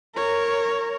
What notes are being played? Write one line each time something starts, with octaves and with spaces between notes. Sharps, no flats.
A#4 C#5